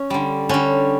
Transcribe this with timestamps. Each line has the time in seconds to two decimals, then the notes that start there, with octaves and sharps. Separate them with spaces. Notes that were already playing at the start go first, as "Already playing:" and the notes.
Already playing: C#4
0.10 D3 G3
0.49 D3 G3 C#4